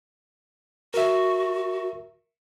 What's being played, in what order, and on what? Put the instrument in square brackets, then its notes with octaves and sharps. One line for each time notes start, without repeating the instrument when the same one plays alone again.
[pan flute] F#4 [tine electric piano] A#4 E5